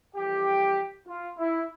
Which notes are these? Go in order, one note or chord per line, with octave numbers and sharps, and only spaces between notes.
F2 E3 G3 G4
F4
E4